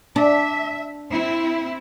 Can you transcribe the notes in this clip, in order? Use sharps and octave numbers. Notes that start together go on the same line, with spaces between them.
D4 E5
C4 E4